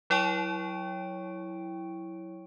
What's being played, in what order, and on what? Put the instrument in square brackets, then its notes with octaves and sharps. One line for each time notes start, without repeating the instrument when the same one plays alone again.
[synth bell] F#3 E4 C#5 G5 C#6 D7